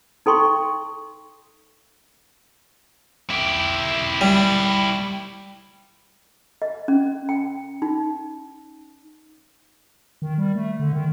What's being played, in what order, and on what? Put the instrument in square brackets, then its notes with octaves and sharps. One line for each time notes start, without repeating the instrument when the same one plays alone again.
[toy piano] D#4 A4 G5 C6 C#6
[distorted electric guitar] E4 G4
[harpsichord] G3
[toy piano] D#5
C#4
G5
D#4
[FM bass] D#3
G3
A3
D3
D#3